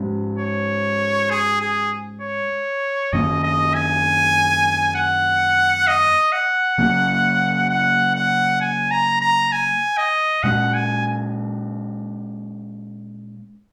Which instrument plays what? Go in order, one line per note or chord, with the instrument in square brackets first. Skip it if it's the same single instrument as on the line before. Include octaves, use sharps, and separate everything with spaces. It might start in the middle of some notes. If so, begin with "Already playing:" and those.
Already playing: [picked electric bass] G#2 G#3 C#4
[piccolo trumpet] C#5
G#4
G#4
C#5
[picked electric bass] F#2 D#3 A#3 C#4 [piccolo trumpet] D#5
[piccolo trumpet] D#5
G#5
F#5
D#5
F#5
[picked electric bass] C#3 F#3 A#3 C#4
[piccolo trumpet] F#5
F#5
G#5
A#5
A#5
G#5
D#5
[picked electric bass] A#2 G#3 C#4 [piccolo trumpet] F#5
[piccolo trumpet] G#5